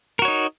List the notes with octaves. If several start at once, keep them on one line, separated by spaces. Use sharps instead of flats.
D#4 F#4 A#4 C#5